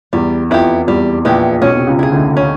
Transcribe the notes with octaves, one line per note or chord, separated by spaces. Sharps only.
E2 G3
F2 B3 E4 G4
E2 G3
A#1 A#2 B3 E4 G4
B1 B2 C#4
C3
C#2 C#3
E4 G#4
D2 D3
C#4